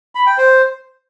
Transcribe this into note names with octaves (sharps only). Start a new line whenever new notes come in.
B5
G5
C5